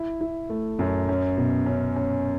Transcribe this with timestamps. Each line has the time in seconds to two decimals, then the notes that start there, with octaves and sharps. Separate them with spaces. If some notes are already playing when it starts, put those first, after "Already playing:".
Already playing: E4
0.21 E4
0.50 A3
0.79 F#2
1.09 C#4
1.37 B2
1.66 C#4
1.96 C#4